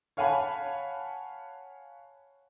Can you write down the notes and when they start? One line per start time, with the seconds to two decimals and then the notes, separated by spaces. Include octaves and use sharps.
0.17 C#5 F5 F#5 G#5 A5 B5